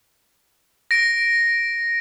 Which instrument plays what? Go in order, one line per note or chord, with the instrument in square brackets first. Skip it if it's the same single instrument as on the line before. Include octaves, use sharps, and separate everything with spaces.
[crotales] A#6 D7